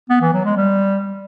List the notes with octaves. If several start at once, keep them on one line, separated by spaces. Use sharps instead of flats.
B3
E3
F#3
G#3
G3